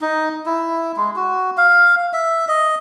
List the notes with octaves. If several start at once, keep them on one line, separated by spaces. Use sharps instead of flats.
D#4
E4
G#3
F#4
F5
E5
D#5